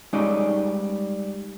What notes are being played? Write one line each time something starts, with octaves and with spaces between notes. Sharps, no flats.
G3 G#3 C#4 D#4 D5 D#5